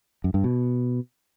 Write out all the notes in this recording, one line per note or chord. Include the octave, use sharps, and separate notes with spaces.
F#2
G2
B2